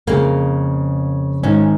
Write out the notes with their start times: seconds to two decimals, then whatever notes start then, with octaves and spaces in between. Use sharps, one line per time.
0.07 F2 C#3 A#3
1.43 G#2 D#3 C#4